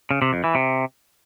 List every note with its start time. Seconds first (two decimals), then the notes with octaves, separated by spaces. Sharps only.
0.11 C#3
0.22 C3
0.33 F2
0.44 E3
0.55 C3